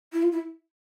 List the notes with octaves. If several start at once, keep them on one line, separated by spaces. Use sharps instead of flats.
E4
F4
E4